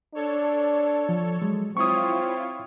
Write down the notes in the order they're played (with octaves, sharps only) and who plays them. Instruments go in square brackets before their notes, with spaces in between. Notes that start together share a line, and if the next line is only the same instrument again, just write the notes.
[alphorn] D4 [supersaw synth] A4 C#5
[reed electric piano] F3
F#3 G#3
[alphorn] C4 [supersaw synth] E4 F4 C#5 [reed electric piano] C#6 D#6